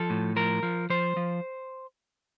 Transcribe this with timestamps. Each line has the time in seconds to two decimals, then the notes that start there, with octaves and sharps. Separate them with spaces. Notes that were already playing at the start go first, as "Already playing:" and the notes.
Already playing: F3 A4
0.10 A2
0.36 F3 A#4
0.63 F3
0.90 F3 C5
1.17 F3